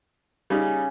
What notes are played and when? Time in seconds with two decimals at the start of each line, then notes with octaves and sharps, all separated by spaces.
0.50 C#3 G3 D#4